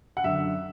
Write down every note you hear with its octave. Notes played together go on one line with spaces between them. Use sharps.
F#5
F#2 D3 E5